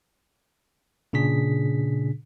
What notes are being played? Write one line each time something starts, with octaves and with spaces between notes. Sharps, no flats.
A#2 C#3 D4 G#4 B6